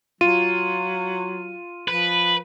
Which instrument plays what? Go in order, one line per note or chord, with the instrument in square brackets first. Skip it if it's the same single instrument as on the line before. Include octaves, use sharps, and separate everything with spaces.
[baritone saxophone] F#3 [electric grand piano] F4 [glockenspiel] D#7
[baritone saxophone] F3 [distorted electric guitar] B4